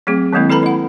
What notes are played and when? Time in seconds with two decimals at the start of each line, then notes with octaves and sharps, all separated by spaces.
0.07 F#3 A3 C4 G#4
0.33 D#3 F#3 G#3 A#3 C4 E4
0.50 E4 A4 B4 A#5 B5
0.63 E4 F#5